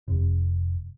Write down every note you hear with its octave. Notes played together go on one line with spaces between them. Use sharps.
F1